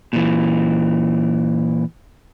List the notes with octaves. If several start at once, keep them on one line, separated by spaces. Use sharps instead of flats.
A#2 E3